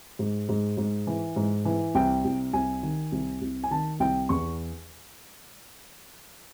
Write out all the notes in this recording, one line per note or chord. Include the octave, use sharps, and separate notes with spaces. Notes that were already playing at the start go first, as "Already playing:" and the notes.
G#2
G#2
G#2
E3
G#2
E3
C2 G5
C2
C2 G#5
D#3
C2
C2
G#5
D#3 A5
C2 G5
E2 C#6